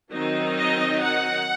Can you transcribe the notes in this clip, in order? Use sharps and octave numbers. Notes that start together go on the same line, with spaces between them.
D#3 F#3 C4 D#4
D#5
F#5